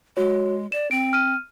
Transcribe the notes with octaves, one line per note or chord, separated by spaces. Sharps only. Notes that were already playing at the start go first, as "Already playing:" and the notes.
G#3 F#4 C#5
D5 E7
C4 D7
F6 D#7